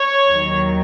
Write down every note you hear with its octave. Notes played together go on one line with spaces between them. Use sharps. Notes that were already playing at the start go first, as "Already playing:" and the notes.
Already playing: C#5
D#2 D#3 F#3